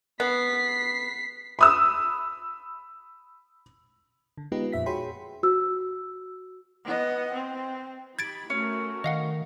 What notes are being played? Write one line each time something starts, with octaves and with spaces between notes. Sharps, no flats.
B3 B6 C7
B5 D#6 E6
D3
G#3 B3 D#4 F4 G4 B4
F2 A#2 E5 B6
F#4 G#4 C#5 G5 B5 C6
F#4 E6
B3 D#5
C4
D#4 G4 B5 G#6 A6 D7
A3 C#4 F#4 A#4
D#3 D#5 F5 F#5